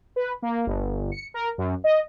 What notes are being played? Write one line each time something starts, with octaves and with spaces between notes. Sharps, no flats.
B4
A#3
G1
C#7
A#4
F#2
D#5